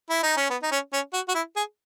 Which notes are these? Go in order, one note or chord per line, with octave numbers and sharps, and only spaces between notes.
E4
D#4
C#4
B3
D#4
C#4
C#4
F#4
F#4
E4
G#4